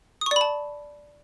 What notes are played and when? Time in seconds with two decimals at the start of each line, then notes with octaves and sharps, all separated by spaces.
0.21 D#6
0.26 C#6
0.31 D5
0.36 B5
0.41 A5